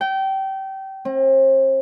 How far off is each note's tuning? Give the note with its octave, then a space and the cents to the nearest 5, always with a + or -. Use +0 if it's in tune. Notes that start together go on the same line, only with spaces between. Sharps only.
G5 -25
C4 +40